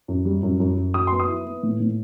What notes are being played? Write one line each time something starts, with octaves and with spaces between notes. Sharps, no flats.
F#2
G3
F#2
F#2
F#2
F#3 D#6
B3 C6
D#6
E4
B3
A2
A2